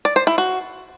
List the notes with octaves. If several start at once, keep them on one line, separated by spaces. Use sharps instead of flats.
D5
C5
E4
F#4